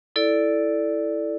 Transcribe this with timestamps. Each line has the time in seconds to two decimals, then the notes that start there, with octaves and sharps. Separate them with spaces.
0.16 E4 A4 D5